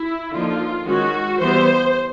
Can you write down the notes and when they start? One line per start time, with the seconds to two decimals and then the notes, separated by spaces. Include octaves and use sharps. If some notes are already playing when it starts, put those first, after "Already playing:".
Already playing: E4
0.32 D3 F3 A#3 D#4 F4
0.86 D#3 G#3 C#4 F#4
1.39 E3 G3 B3 C5